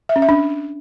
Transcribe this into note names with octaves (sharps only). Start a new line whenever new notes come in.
E5
C#4
E5
D4